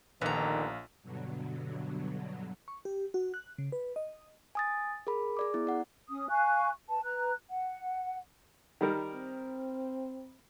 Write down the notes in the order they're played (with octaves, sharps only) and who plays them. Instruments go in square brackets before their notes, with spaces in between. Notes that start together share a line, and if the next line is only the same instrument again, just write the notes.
[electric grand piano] A#1 F5 [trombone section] G2 A#2 D3 [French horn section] D#3 [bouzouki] B3 A#5
[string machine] G2 B2 D3 F#3
[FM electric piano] C#6
G4
F#4
F#6
C#3
B4
D#5
[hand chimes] G#5 D#6 A6
G#4 A#4 B5
G#4 D5 D6
B3 E4
D5 F#5
[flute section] C#4 D#6
F5 G#5 C#6 F#6
B4 A5
B4 A#5 F#6
F#5
[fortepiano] D#3 G3 A#4
[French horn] C4